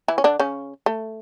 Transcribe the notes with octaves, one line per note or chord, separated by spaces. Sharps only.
E3 E4
C#4
D3 D4
C#3 C#4
A3